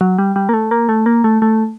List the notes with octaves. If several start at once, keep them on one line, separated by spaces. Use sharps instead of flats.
F#3
G3
G3
A#3
A3
A#3
A3
A#3
A3
A3